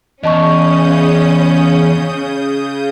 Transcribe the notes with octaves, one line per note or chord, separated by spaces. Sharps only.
E2 C#3 C#4 D#5 A5 C#6 D#6 G6